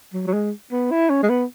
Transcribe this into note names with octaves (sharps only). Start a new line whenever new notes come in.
F#3
F#3
G#3
B3
E4
C#4
G#3
B3